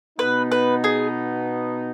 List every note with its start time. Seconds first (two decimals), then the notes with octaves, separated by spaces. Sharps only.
0.19 B2 B3 D#4 B4
0.52 B4
0.84 G#4